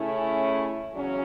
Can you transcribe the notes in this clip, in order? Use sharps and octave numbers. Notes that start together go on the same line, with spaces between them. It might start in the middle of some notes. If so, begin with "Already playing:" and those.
Already playing: C#3 A3 C#4 E4
E2 C#3 F#3 C#4